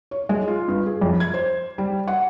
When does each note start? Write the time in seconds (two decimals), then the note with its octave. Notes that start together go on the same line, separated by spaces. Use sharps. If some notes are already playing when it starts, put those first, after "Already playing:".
0.11 C#5
0.29 G#3
0.47 F4
0.68 G2
0.86 G#4
1.01 F2
1.20 G#6
1.34 C5
1.78 G3
2.08 F#5